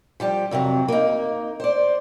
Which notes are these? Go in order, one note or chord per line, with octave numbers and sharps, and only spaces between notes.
F3 G3 G4
F2 C3 E3 F#3
A#3 D#4
C5 D5